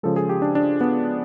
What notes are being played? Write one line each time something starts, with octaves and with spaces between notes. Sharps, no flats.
C#3 F3 G#3 A4
G#4
G4
D4
D4
B3